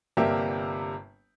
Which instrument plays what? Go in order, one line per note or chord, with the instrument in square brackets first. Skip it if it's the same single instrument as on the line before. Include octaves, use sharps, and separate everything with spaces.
[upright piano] G1 C3 G3 A#3 G4 E5